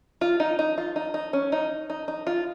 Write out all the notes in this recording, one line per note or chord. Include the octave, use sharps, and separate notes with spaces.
F4
D#4
D#4
F4
D#4
D#4
C#4
D#4
D#4
D#4
F4